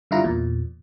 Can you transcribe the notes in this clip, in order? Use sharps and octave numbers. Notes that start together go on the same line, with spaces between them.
G2 D3 E4 F4 A#5
E2 A#2